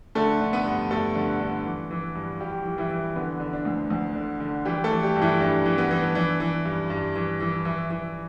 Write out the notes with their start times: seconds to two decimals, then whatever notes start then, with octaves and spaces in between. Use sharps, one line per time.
0.15 D3 A3 A4
0.41 D3
0.53 B3 B4
0.65 G2
0.91 G2 A3 A4
1.15 D3
1.41 D3
1.66 E3
1.91 E3
2.15 G2
2.40 G2 G3 G4
2.65 E3
2.78 E3 E4
2.91 E3
3.15 D3 B3
3.40 D3
3.53 D4
3.65 D2
3.90 D2
4.15 D3
4.40 D3
4.65 E3 G3 G4
4.84 A3 A4
4.91 E3
5.03 G3 G4
5.15 G2
5.22 E3 E4
5.40 G2 D4
5.65 E3
5.78 B3
5.91 E3
6.15 E3 D4
6.40 E3
6.65 G2
6.90 G2
7.16 E3
7.41 E3
7.65 E3 E4
7.90 E3